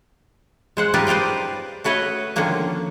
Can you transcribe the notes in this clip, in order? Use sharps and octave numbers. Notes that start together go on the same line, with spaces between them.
G#3 C5 F#5
D#4 F4 G4 A#4 B4 D5
B4 C5 D5 F5 G5
A3 F#4 B4 C#5 D#5
D3 D#3 F3 A#3 C#4